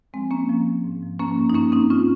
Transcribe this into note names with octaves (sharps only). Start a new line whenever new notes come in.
F3 G#3 C4
F3 A#3 C#4
F3
F3
G#2
F3
F3 A#3 C#4
G2
D#4
D#3 A#3 C#4
G2 C4 D#4
D#3 C#4 F4